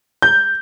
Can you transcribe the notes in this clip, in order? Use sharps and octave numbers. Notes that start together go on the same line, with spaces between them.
G6